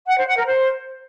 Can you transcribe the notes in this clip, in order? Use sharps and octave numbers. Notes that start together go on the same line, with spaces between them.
F#5
C5
F#5
A#4
C5